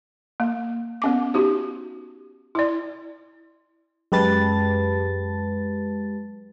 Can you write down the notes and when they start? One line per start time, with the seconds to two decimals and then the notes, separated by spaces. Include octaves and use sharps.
0.40 A#3
1.02 B3 C#4 D6
1.34 D#4 F#4 G4
2.55 E4 D5
4.12 F#2 G#3 G4 B4 A5 A6